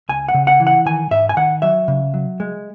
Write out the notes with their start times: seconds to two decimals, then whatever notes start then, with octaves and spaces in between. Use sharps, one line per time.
0.09 C#2 G#5
0.28 F#5
0.34 C#3
0.47 F#5
0.60 E3
0.67 F#5
0.86 D#3 G#5
1.11 G#2 E5
1.29 G#5
1.37 D#3 F#5
1.62 F#3 E5
1.88 C#3
2.14 F#3
2.40 G#3